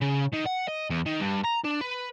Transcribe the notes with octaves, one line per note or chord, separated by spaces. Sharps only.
C#3
D#3
F#5
D#5
E2
D#3
G2
A#5
D4
B4